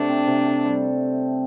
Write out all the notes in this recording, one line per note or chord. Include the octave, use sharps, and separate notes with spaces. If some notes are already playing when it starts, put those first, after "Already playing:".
Already playing: C3 A3 D4
C4
C3
A4
G3